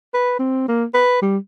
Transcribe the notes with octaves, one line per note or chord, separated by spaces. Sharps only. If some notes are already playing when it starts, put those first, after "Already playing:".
B4
C4
A#3
B4
G3